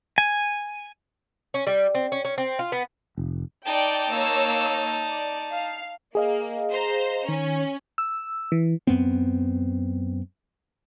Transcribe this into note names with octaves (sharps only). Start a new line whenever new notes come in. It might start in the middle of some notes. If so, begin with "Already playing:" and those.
G#5
C#4
G3
C4
C#4
C#4
C4
F4
B3
F1
D#4 D5 G5 A5
A#3 C#5 E6
D5
F5
A#3 G#4 D#5 F5
C5 A#5
D#3 C#4
E6
E3
F#2 B3 C4